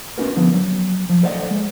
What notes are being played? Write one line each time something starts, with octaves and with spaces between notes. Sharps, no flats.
B3 C#4 D#4 F#4 A#4 B4
D3 F3 B3
F#3
F3
A4 C5 D5 D#5 F#5
G#3